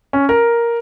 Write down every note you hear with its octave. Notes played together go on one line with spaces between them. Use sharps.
C#4
A#4